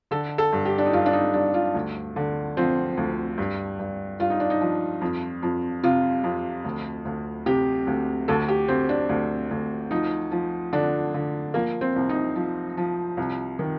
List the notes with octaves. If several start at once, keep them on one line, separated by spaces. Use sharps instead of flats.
D3 A4
A4
G2
G4
D4
D#4
G2 F4
D4
D#4
G2 D4
F4
D2
D3
F3 C4
D2
G2
G2
G2 F4
D#4
D4
D#4
F3
F2
F2
C3 F4
F2
D2
D2
C3 G4
D2
D2 A4
G4
D2 C4
D4
D2
D2
F3 D#4
F3
D3 D4
D3
F3 A#3
C4
C2
D#4
F3
F3
C2
D#3